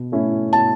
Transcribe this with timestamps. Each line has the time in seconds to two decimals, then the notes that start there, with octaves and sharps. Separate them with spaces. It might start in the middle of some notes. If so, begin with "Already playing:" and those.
Already playing: B2
0.12 A3 C#4 E4
0.52 B2 A5